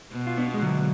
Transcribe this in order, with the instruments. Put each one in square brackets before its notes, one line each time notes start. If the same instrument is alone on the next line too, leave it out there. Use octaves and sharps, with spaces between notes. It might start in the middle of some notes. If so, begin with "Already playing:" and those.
[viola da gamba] B2
[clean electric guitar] F4
B3 D4
G#3
D3 F#3